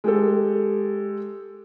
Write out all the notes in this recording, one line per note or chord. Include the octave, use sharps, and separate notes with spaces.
G#3 G4 A4